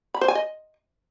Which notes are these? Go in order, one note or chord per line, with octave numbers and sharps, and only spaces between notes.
B5
C5
G#5
D#5